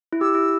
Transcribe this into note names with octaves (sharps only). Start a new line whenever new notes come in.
E4
G4 E6
E4